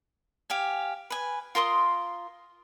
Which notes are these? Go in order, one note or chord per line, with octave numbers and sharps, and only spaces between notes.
G4 F5 G#5
B4 G#5
F4 A#4 C6 D#6